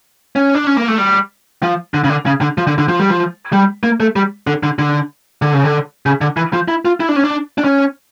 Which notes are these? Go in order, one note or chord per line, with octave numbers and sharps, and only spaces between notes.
C#4
D4
C#4
A#3
A3
G3
F3
D3
C#3
D3
C#3
D3
F3
D3
D3
F3
G3
F3
G3
A#3
A3
G3
D3
D3
D3
D3
C#3
D3
C#3
D3
E3
F3
E4
F4
E4
D4
C#4
D4
D4
C#4